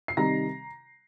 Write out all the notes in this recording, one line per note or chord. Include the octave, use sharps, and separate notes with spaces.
C7
C3 D#3 G3 A#5 A#6